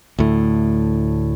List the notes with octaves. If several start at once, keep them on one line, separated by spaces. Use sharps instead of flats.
D2 A2